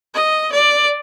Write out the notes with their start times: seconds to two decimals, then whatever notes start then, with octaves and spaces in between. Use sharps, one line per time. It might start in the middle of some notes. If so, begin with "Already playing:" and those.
0.14 D#5
0.52 D5